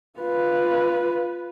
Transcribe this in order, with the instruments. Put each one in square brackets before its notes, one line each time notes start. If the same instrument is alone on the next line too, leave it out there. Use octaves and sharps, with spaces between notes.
[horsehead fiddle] F4 B4